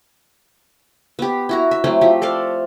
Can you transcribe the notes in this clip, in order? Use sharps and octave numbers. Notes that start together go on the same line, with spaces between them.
B3 G4
E4 F#4 A#5
E5
F#3 A3 C4 E4
F3 G4
A4 C5 D5 F5